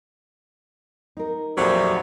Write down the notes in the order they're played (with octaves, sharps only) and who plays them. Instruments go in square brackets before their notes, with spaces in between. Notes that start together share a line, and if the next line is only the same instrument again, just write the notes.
[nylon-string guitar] D#4 A#4
[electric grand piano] F2 A#2 [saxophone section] F#3 G3 A3 [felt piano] C5